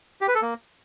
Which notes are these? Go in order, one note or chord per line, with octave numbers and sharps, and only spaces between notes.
G4
B4
A4
A#3